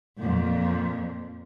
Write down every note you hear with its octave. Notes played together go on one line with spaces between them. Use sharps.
F2 A#2